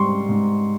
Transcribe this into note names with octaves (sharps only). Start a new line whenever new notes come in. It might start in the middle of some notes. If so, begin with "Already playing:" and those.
Already playing: G#2 G3 C6 C#6
G#2